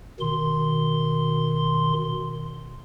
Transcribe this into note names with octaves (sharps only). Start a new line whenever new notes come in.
B2 D#3 C6